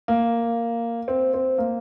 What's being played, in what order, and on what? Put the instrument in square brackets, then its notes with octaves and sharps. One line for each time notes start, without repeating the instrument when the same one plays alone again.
[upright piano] A#3
C4
C4
A#3